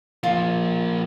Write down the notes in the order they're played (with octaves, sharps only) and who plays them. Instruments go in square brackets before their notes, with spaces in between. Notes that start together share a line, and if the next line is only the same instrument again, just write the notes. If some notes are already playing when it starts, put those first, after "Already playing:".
[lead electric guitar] F3 A#3 [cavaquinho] F4